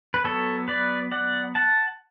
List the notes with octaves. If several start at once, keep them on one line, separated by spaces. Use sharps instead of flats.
B4
F#3 B3 A4 C#5
B4 D5
D5 F#5
F#5 A5